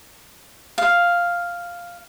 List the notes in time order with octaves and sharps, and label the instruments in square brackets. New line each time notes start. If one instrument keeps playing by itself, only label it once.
[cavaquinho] F5